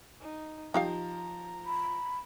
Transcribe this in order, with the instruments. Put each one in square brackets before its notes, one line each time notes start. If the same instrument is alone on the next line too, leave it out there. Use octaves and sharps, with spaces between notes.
[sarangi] D#4
[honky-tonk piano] F3 [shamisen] D#4 G4 F5 [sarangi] A#5
[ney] B5